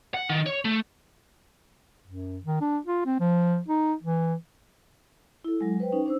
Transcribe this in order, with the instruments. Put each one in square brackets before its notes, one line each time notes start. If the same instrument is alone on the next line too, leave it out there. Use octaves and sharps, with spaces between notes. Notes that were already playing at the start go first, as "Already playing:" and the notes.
[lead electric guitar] F#5
D#3
C#5
A3
[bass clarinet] F#2
D#3
D4
F4
C4
F3
D#4
E3
[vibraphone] E4 A4
F#3 G#3
B4 C5 G5
C#4 D#4
D4 C5 E6